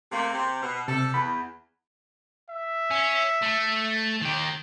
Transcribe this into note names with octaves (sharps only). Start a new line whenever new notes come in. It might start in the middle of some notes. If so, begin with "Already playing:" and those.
C3 A3 A#3
C3
B2
C3 G3 A4
E2 B5
E5
C#4
A3
D#3 G4